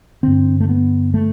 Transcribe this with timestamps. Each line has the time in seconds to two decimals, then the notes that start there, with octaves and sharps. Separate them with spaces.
0.23 G2 D3 C4
0.60 A3
0.69 B3
1.14 A3